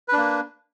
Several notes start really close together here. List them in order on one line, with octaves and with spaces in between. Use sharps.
B4 D4 A#3